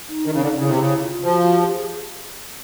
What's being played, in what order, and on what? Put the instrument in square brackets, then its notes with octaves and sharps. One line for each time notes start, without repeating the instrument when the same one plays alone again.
[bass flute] D#4
[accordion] D#3 [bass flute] D4
[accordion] C#3
[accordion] D3 [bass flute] D#4
[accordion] C#3 [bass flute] E4
[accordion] C3
[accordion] C#3 [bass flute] E4
[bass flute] F4
[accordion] F3 [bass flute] F#4
[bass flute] F#4
G4
G#4